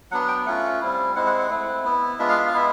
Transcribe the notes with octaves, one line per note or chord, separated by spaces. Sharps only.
F#3 B3 D4 F#5
G5
A3 C#4 F4 F#5
G3 C4 E4
G#3 C4 E4 F#5
F#5
F#5
A3 C4 E4
B3 E4
G#3 B3 D4 F4 E5
F5
E5
F5
G#3 B3 E4 E5